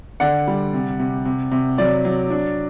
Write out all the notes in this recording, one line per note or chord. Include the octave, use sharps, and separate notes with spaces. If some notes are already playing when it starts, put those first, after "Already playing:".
D3 D5 F#5
G3
C3
C3
C3
C3
F#3 D5
F#3
D4